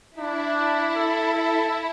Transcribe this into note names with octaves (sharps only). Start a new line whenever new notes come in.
D4 E4
A4
A4